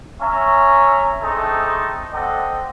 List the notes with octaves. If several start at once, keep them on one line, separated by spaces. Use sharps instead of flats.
C#4 E5 A#5
A3 C4 D4 D#4 G#4 A4
C4 A4 D5 D#5 F#5